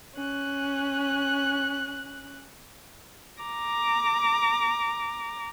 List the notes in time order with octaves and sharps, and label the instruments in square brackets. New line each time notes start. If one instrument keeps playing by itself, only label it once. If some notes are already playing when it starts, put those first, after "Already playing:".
[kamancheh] C#4 F#6
[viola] A#5 D6